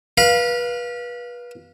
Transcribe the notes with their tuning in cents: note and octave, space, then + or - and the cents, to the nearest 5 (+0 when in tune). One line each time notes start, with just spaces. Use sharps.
B4 -30 F5 +0